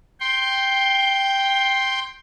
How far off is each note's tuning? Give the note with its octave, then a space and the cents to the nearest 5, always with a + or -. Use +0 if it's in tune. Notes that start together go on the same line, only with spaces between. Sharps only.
G5 +0 C6 +10